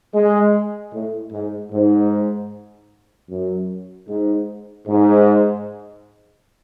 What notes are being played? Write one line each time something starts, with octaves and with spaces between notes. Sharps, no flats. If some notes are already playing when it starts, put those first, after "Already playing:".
G#3
A2
G#2
G#2
F#2
G#2
G#2